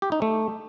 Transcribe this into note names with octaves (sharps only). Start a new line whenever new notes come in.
G4
D#4
A3